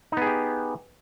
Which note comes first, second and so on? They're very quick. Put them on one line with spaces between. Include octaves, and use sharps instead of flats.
D#4 B3 G#4 G4